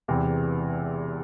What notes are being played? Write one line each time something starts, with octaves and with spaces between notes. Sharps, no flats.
E1 E2 C3 E3